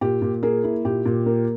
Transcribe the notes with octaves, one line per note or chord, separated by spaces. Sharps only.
A#2 G4
A#2
A#3 G#4
E4
A#2 G4
A#2
A#3